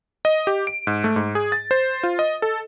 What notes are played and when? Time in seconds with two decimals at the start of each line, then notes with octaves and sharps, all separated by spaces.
0.25 D#5
0.47 G4
0.67 D7
0.87 G#2
1.04 A3
1.16 G#2
1.35 G#4
1.52 A6
1.71 C5
2.03 F4
2.19 D#5
2.42 A4